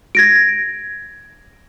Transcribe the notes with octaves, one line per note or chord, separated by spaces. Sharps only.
G#6 A#6 D7